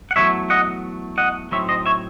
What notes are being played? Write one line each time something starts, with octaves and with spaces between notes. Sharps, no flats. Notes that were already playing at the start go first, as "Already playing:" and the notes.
F#5
E2 C3 F#3 A3 C#5 E5
D#5 F#5
D#5 F#5
A2 F#3 C4 D#4 C#5 E5
C5 D#5
C#5 E5